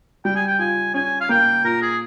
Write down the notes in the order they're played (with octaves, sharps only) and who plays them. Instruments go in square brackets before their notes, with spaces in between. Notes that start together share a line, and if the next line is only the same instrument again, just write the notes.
[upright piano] G3 [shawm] G5
[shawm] G#5
G5
[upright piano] F4 [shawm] G#5
[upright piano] C#4 [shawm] G#5
[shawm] F5
[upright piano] A#3 [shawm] G5
[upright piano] A#2 [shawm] A#4
[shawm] G#4